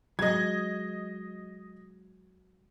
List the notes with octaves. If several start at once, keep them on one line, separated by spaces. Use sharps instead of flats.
F#3 G#3 D#5 G#6